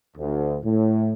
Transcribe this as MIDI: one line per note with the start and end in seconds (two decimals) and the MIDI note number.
0.17 0.57 38
0.63 1.13 45